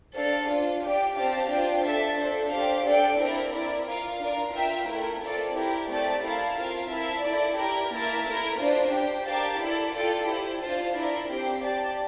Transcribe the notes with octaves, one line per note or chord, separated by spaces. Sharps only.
D4 A4 C5 F5
D4 F4 C5
D4 G4 D5 G5
C4 G4 C5 F5 A5
D4 F4 C5 G5
D4 A4 E5 A5
D4 A4 C5
D4 G4 C5 F5
D4 A4 D5 G5
C4 E4 A#4 D5
E4 A#4 D5
F4 A#4 F5
D4 F4 A#4
F4 A#4 E5 G5
A3 E4 A#4
C4 F4 A4 D5
E4 G4 A#4
A3 C4 G4 D5 A5
E4 A#4 F5 A5
C4 F4 A#4 F5
E4 A#4 E5 A5
E4 A4 D5
E4 G4 A#4
A#3 E4 A#4 E5 A5
A3 E4 A#4
D4 F4 C5
G4 C5 G5
G4 A#4 D5 F5 A5
E4 A4 D5
F4 A4 D5 G5
E4 G4 C5
D4 F4 C5 F5 A5
E4 A#4 D5
C4 G4 C5 G5
G4 D5 A5